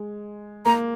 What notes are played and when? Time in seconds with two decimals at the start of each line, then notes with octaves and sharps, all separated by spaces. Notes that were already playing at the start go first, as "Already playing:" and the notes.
Already playing: G#3
0.66 A#3 A#5